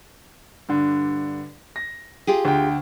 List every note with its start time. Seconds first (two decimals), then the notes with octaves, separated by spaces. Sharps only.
0.69 G2 D3
1.76 A#6
2.27 F4 G4 G#4
2.45 D2 G5